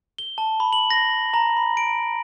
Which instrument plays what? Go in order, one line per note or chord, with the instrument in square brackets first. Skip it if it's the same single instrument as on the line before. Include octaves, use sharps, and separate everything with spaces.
[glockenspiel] G7
A5
B5
F#7
A#6
A#5
B5
D7